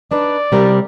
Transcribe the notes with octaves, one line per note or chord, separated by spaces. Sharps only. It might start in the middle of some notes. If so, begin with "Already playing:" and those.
D4 D#4 B4 D5
C3 G3 A#4